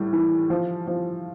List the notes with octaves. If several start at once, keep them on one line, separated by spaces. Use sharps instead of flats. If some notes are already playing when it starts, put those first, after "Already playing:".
Already playing: A2 G3
E3
F3
F3